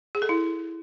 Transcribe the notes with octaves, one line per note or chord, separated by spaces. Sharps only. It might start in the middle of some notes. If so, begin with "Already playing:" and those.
G#4
A4
E4